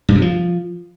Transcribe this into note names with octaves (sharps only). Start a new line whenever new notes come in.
G2
C3
F3